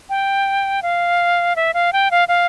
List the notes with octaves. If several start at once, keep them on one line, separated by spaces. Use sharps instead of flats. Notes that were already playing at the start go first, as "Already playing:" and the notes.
G5
F5
E5
F5
G5
F5
F5